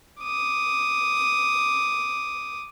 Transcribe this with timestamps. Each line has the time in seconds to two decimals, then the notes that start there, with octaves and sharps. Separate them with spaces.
0.22 D6 D#6